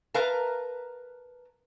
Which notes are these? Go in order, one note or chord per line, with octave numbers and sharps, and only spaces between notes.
A#4 B4 F5 A5 A#5